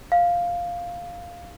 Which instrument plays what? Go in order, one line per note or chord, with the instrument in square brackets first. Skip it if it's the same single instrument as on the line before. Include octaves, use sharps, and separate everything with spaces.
[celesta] F5